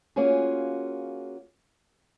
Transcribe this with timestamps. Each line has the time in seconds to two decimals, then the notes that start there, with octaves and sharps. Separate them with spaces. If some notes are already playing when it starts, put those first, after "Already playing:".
0.16 A#3 C#4 F4 F#4 G#4